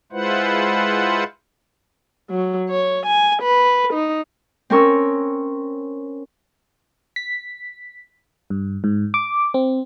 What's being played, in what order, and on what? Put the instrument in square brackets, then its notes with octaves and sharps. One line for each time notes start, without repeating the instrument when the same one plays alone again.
[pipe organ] G#3 E4 F4 B4 C5 F#5
[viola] F#3
C#5
G#5
B4
D#4
[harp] C4 C#4 A#4 C#6 E6
[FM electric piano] B6
G2
G#2
D6
C4